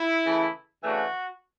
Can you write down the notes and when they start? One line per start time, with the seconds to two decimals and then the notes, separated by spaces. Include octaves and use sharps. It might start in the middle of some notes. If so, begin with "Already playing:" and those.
Already playing: E4
0.26 C#3 E3 A3
0.84 C#3 E3 A3 D4 F#4